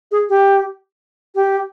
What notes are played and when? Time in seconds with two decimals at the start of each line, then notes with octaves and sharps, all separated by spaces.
0.11 G#4
0.29 G4
1.35 G4